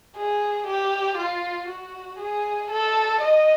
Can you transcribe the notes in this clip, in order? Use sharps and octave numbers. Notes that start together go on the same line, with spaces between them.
G#4
G4
F4
F#4
G#4
A4
D#5